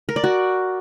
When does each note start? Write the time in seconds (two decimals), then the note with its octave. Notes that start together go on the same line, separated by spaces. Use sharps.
0.09 A#4
0.16 D5
0.24 F#4